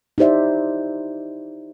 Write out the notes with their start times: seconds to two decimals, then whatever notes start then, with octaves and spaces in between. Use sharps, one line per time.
0.18 D#4 E4 G4 C5 D5 E5